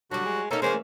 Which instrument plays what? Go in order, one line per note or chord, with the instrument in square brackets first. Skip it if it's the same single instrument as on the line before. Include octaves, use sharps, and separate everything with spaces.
[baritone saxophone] D3 [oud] F#3 G3 [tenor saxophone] F#4
[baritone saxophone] G#3
[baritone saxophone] A#3 [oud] C#4 D#4 [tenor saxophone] A4
[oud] E3 A#3 C#4 [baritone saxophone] G#3 [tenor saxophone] C5